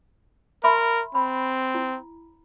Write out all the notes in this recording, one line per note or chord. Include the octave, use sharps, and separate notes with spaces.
A#4 E5 B5 C6
C4 B5
E4